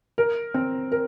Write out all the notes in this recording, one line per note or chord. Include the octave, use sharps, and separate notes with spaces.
A#4
C4
A#4